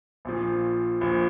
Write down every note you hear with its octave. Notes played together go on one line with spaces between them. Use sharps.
A#1 A#2 F3
A#1 A#2 F3